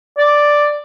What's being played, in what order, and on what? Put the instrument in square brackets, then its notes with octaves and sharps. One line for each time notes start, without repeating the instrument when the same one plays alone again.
[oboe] D5